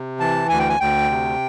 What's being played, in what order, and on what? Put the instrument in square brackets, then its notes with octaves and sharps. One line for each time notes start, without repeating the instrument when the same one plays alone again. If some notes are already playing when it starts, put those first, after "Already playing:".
Already playing: [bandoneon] C3
E3 A5
D2 G#5
G5
G#5
D2 G5
C3